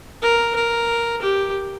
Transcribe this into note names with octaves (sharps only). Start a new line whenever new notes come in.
A#4
A#4
G4